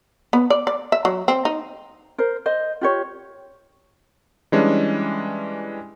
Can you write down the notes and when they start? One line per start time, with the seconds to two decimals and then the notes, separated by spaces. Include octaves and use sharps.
0.33 B3
0.50 D5
0.67 D5
0.92 E5
1.05 F#3
1.28 C4
1.45 D#4
2.18 A#4 C5
2.46 C5 D#5
2.81 F4 G4 C#5
4.52 E3 G3 G#3 C#4 D4